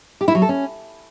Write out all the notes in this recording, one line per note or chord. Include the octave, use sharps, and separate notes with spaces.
G4
E4
F#3
A4
C#4